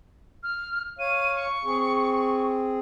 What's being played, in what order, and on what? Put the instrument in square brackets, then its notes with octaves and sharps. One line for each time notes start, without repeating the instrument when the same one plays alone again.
[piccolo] F6
[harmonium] C#5 F5 [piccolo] D#7
[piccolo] C#6
[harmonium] C4 G#4